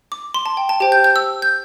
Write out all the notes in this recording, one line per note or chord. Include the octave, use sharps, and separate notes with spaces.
D6
C6
A5
G5
A5
G4 C5 G5 A5
G6
G6
E6
G6